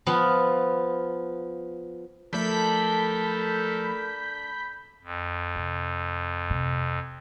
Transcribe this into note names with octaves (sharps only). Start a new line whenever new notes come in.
F3 B3 F5
F3 A3 D4 A4 A#4 B5 G6 B6
F2
C3
C3